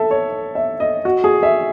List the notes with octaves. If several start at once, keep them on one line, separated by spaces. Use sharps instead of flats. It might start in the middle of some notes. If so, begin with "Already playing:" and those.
Already playing: A4 E5
C#5
E5
D#5
F#4
G#4
E5